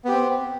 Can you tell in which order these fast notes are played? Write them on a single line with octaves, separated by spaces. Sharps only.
B3 G4 C4